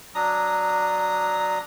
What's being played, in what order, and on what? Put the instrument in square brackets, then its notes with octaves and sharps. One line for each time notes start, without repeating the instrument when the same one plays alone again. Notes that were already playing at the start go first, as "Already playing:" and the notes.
[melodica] F#3 D4 A#5 D#6